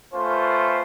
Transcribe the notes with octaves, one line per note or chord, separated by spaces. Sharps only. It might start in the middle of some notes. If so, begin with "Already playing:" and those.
A3 C#4 F4 B4 C5